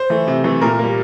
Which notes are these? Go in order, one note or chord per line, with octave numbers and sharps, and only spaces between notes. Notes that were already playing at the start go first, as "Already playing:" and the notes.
Already playing: C5
E3 A3
C3
E3 A3
A#2 A#4
G3 A#3